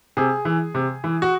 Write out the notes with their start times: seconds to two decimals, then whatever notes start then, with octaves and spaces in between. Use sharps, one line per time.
0.17 C3 G#4
0.45 E3
0.75 C3
1.04 E3
1.22 F#4